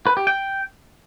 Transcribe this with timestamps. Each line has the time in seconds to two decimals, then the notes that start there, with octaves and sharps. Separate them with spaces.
0.07 B4
0.17 G4
0.27 G5